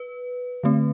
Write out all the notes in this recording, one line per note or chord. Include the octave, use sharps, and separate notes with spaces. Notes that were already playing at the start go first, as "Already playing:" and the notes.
Already playing: B4
D3 A3 C4